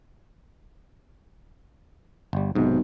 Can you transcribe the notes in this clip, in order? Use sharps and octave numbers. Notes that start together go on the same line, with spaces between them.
G1 G3
B1 G#2 C3